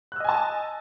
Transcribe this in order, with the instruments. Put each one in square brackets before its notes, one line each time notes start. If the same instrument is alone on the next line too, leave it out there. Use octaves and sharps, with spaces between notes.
[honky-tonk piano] F#6
E6
D#5
G#5
A5